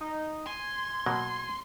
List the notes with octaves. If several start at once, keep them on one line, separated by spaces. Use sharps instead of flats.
D#4
G#5 C6
B2 F#3 A#3